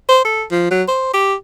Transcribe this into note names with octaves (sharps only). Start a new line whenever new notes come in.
C5
A4
F3
F#3
C5
G4